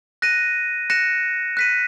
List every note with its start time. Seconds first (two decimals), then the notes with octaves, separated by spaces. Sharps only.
0.22 F#6 A#6 D#7
0.90 F#6 A#6 C#7 E7
1.57 F#6 B6 D#7